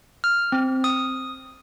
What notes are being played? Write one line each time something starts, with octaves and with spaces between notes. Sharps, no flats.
F6
C4
D#6